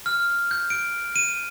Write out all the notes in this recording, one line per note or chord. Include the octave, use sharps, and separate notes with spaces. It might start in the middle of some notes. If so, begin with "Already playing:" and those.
F6
G6
D7
D#7